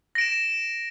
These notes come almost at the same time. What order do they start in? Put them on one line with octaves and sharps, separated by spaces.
A#6 D7 E7